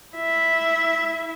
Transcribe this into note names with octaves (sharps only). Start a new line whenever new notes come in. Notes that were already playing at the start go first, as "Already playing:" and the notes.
E4 E5